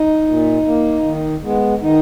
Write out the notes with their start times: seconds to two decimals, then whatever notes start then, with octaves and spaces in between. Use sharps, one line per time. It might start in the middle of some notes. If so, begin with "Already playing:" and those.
Already playing: D#4
0.27 A#2
0.66 A#3
1.05 D#3
1.43 G#3 B3
1.82 D#3 D#4